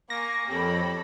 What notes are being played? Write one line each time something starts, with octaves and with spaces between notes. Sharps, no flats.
A#3 G#5 C#6 A#6
F2 G4 A4 C#5 B5